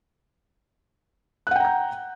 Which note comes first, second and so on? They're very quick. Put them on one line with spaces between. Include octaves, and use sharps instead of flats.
F#6 F#5 G5 A#5 G6